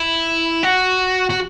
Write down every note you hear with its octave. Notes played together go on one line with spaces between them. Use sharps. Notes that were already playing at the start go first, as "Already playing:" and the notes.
Already playing: E4
F#4
F#4